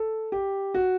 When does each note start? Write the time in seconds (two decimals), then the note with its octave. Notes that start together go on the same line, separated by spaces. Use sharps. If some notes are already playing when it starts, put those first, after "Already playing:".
Already playing: A4
0.32 G4
0.74 F#4